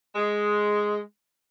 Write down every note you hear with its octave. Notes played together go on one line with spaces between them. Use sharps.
G#3